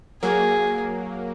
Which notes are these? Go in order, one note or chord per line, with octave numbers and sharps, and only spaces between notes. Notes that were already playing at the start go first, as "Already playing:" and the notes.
F#3 A#3 G#4